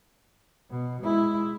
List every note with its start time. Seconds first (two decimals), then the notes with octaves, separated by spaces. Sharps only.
0.70 B2
1.01 G#3 E4